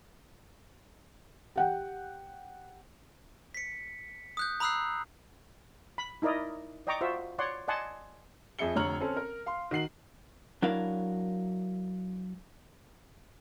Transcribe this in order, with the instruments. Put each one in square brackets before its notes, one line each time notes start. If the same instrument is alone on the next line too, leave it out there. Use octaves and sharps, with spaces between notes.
[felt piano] G4 F#5 G5
[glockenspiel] B6 C#7
D#6 F#6 G6
A#5 B5 D#6 E6 F#6 C7
[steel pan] B5
D#4 E4 A#4 D5 D#5
D5 D#5 G5 A#5 C#6 D6
F4 F#4 C5 E5
C#5 D5 F#5 C6
D5 D#5 F#5 G#5 A5 C6
[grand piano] F2 G#4 E5 C#7 G7
F1 D3 C#5 A#5 F6 F#7
C4 C#4 A4
A#4
F5 C6
D#3 F#4 C7 F#7
[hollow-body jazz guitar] F#3 D4 E4 A#4 F5